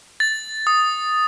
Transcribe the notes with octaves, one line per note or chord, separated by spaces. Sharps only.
A6
D#6